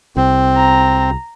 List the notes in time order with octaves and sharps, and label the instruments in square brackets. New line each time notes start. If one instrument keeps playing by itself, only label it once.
[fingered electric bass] C2 [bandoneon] C4
[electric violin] A#5